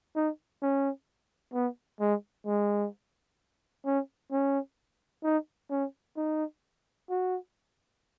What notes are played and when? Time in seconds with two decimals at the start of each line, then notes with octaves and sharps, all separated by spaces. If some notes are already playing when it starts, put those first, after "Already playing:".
0.15 D#4
0.62 C#4
1.54 B3
2.00 G#3
2.46 G#3
3.85 C#4
4.31 C#4
5.24 D#4
5.71 C#4
6.16 D#4
7.10 F#4